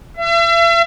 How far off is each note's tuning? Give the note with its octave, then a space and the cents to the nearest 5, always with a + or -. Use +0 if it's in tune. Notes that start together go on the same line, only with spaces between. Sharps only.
E5 +40